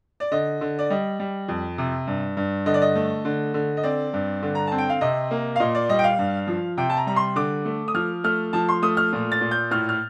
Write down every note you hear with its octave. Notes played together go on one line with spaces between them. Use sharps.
D5
D3 D#5
D3
D5
G3 D#5
G3
F2
C3
G2
G2
D3 D#5
D5
D#5
A3
D3
D3
D#5
C4 D5
G2
D3
A#5
C4 A5
G5
F5
C3 D#5
A#3
F5
A#2 D#5
D5
G3 D#5
G5
F5
G2
F3
C3 G5
A5
A#5
G3 A#5
C6
D3 D6
A3
D#6
F3 F6
A3 F6
F3 A5
C6
A3 D#6
F6
A#2
A6
A#2
G6
A2 F6
F6